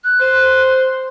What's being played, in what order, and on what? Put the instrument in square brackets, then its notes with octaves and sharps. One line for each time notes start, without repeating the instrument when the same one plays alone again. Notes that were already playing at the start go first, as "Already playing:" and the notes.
[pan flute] F#6
[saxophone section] C5